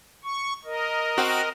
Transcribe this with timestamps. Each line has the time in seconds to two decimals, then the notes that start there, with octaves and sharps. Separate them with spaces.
0.24 C#6
0.65 A#4 D#5
1.17 C4 F#4